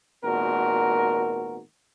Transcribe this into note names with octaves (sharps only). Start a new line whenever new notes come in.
G#1 A#2 B3 F#4 A#4